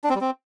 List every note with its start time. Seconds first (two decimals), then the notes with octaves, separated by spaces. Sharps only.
0.04 D4
0.10 C4
0.15 G3
0.21 C4